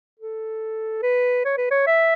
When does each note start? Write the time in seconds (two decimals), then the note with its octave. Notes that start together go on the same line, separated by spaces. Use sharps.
0.19 A4
1.03 B4
1.45 C#5
1.57 B4
1.71 C#5
1.87 E5